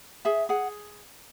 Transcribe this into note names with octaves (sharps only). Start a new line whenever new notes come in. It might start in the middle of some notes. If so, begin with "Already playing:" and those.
G#4 E5
G#4 F#5